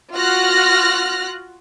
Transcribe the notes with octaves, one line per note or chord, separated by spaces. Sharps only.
F4 F#4 F6 F#6 A#6